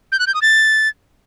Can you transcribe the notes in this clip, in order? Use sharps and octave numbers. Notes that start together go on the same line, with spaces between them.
G6
F#6
G6
D#6
A6